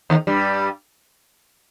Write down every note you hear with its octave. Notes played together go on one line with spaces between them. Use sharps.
D#2 D#3
G2 G3